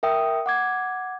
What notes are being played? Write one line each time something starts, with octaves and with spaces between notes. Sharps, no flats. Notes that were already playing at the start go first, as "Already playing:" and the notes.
A#4 E5 G5 D#6
F#5 D6 G#6